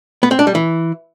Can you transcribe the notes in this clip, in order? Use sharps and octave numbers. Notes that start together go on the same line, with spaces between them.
B3
C4
D4
G3
E3